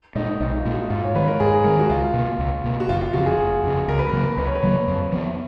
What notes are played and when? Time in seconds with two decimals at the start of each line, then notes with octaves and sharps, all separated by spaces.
0.15 A#2 G#3 D#4
0.40 B1 D#4
0.57 F4
0.65 A#2 G#3
0.73 F#4
0.90 G#2 F4
1.04 C#5
1.15 D#3 G#3 B4
1.28 A#4
1.40 G#2 G#4
1.64 D#3 G#3 A#4
1.79 F#4
1.89 C#2 F4
2.14 B2 A#3
2.39 C#2
2.64 B2 A#3
2.80 F#4
2.88 F#1 F4
3.01 F4
3.13 F2 C#3 F#4
3.26 G#4
3.39 F#1
3.64 F2 C#3
3.88 C#2 A#4
3.99 B4
4.09 C#3 F#3 A#3 A#4
4.37 C#2 B4
4.46 C#5
4.55 B4
4.63 C#3 F#3 A#3
4.87 F2
5.12 F3 B3